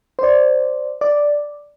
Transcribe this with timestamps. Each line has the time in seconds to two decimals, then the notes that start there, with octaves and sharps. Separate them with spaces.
0.19 C5 D5
1.01 D5